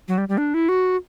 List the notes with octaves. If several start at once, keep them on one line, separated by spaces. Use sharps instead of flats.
F#3
G3
G3
D4
E4
F#4